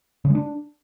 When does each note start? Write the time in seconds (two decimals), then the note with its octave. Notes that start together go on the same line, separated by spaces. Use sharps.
0.25 C#3
0.30 G#3
0.35 D4